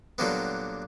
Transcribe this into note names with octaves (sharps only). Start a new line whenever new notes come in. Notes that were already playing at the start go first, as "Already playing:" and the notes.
A#2 D3 F#3 G3 A#3 B3